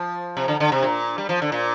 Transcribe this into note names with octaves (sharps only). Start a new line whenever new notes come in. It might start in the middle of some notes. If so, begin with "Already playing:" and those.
Already playing: F3
C3
D3
D3
C3
A#2
G3
F3
D3
A#2